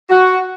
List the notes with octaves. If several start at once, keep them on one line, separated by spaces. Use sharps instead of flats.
F#4